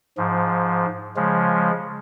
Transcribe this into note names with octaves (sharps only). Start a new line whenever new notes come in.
G#2 F3
C#3 F3 G#3